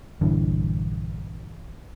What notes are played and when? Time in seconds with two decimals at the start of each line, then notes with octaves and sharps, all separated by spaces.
0.21 A#1 G2 D3 E3